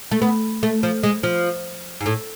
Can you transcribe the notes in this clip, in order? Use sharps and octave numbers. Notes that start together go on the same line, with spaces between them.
A3
B3
A3
F3
G#3
F3
G#2
A2